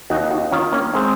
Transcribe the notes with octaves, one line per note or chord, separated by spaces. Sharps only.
D#2 D#4 F#4
D#4 F#4
D#3 C#4 F4
A#3 C#4
D#3 G#3 C4